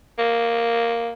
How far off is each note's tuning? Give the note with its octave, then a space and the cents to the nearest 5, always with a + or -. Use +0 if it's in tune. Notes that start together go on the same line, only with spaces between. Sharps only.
A#3 +0